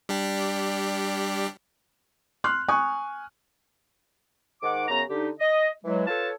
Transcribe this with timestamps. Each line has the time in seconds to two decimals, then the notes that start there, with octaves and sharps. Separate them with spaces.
0.09 G3 D4 G4
2.44 C6 F6 F#6
2.69 G#5 C#6 D#6 F#6
4.62 G#2 D#3 F#5 D6
4.88 F#2 C#3 B3 A#5
5.09 D3 D#4 G4
5.39 D#5
5.85 E3 F#3 G#3
6.07 F4 A4 B4 C#5 A5